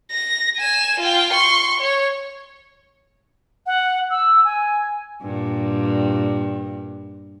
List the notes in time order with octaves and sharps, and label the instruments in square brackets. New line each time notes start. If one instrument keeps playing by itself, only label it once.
[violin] A#6
G#5 E7
F4 G5
C6 C#6
C#5
[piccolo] F#5
E6
G#5
[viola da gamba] G2 A#2